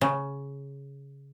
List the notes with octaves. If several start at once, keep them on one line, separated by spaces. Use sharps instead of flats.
C#3